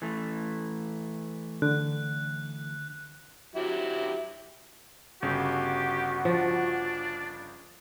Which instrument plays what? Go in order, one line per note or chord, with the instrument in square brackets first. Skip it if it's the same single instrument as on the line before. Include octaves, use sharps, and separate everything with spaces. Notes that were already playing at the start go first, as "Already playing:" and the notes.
[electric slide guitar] E3 A3
[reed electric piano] D3 [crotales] F#6
[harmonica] F#3 E4 G4
[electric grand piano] G1 C#3 [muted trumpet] F#4 [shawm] G4
[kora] F3 [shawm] D4